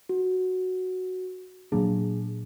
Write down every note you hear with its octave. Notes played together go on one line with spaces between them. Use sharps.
F#4
A#2 F#3 A#3 D4 G#4